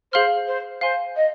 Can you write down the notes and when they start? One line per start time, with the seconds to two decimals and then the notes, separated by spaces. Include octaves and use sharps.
0.12 G#4 C5 F5 C6 F6
0.47 C5
0.81 C5 F5 G#5 C6
1.16 D#5